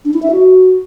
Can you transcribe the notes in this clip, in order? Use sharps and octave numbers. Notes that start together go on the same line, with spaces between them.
D4
E4
E5
F#4